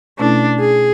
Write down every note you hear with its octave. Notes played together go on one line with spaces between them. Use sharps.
B2 A3 C#4 D4 E4 A4
G#4